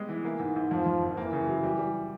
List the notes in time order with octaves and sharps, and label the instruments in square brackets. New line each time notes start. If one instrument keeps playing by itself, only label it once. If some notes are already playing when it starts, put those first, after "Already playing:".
Already playing: [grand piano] G3 G#3 B3
E3
[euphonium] E3 [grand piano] A#3
[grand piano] G#2
G#2
[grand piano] F2 [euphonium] F3
[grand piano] F2
F#1
[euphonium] E3 [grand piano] A#3
[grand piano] C#3
F#3
G3
G3